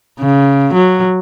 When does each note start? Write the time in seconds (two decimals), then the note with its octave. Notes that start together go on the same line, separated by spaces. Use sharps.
0.19 C#3
0.74 F#3